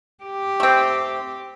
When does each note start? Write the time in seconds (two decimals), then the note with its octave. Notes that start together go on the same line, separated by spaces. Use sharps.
0.24 G4
0.60 A3 C4